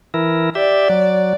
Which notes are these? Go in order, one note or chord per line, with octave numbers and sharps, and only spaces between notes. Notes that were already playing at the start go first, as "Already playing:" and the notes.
E3 E4 A#4
G4 D5 E5
F#3